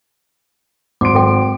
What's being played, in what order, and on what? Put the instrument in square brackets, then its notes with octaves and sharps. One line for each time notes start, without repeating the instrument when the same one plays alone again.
[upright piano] G#1 C6 D7 [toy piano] D6
[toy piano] A4 G5